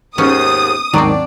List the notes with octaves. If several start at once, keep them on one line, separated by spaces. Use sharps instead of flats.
D#2 G#2 B3 C#4 D#6
D#2 G#2 D#3 F#3 C4 D4 D5